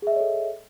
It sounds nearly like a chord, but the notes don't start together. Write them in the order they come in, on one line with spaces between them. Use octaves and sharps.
G#4 E5 D#5 C#5 A4